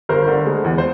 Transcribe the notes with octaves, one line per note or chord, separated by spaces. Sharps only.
G1 A#4 C5
D3
G#3
E2
C5